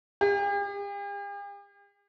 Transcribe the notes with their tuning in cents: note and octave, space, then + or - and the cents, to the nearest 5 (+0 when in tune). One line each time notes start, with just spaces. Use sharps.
G4 +45